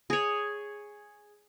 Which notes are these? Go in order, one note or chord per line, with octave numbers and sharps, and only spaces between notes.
G#4 C#5